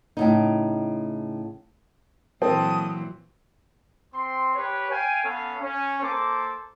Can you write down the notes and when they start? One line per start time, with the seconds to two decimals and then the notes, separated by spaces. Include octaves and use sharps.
0.17 A2 C#3 D#4
2.42 A#2 E3 F#3 C4 A4 D#6
4.13 C4 C6
4.55 G4 B4 C#5
4.90 F5 G5 G#5
5.22 B3 C#4 A4 F5
5.59 C#4
6.01 A#3 A4 C5 D6